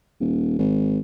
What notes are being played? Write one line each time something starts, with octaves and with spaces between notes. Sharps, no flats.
D#1
G#1